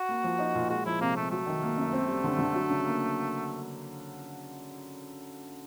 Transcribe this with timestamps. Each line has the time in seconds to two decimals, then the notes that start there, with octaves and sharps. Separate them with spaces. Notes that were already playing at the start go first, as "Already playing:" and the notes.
Already playing: F#4
0.09 A#3
0.24 F3
0.39 D#4
0.55 A#2
0.70 G#3 F#4
0.85 F3 E4
1.01 C3 A#3
1.16 C3 A3
1.31 F#3 A3
1.47 D#3
1.63 A#3
1.78 F#2
1.93 C4
2.08 G3
2.24 D3
2.39 D3
2.55 F#3
2.70 C#3
2.85 A#3